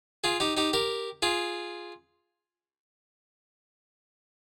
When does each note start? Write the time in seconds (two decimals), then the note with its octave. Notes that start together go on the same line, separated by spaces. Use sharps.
0.24 F4 G#4
0.40 D#4 G4
0.57 D#4 G4
0.73 G4 A#4
1.22 F4 G#4